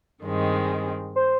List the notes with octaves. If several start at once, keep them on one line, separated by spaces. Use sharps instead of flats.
G2 D#3 G#3 C4
C5